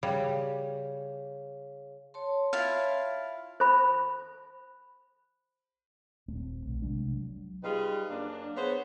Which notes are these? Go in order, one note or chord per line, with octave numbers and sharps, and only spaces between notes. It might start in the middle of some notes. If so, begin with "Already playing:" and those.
C#3 G3 G#4 C#5 F5
C#5 A5 C6
E4 F4 F5
C5 B5
D#1 A3 C4
B1
C3 F#3 G#3 D4
F#3
G3 D#4 F4 G#4 B4
F#2 A#3 D4
B3 G#4 C5 C#5